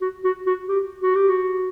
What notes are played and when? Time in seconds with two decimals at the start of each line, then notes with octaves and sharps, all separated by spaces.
0.01 F#4
0.24 F#4
0.46 F#4
0.68 G4
1.02 F#4
1.15 G4
1.29 F#4